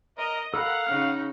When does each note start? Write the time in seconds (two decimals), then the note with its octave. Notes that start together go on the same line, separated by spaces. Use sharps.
0.18 A#4 D#5
0.54 A4 A#4 F5 F#5 B5
0.87 C#3 D#4 F6